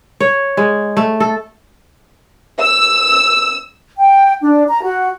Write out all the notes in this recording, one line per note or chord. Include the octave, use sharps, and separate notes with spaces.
C#5
G#3
A3
A4
E6
G5
D4
A#5
F#4